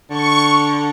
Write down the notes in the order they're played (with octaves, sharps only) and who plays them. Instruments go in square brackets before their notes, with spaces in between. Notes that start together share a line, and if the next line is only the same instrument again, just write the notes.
[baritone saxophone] D3 [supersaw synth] C#6